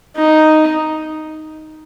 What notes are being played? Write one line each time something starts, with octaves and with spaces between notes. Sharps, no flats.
D#4